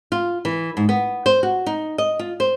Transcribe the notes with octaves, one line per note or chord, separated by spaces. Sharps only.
F4
E3
G#2
B3
C5
F#4
D#4
D#5
F4
C5